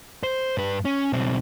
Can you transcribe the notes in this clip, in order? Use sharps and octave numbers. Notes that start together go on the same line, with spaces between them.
C5
G2 B4
C#4
B1 C4